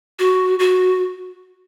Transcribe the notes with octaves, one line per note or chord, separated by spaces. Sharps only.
F#4
F#4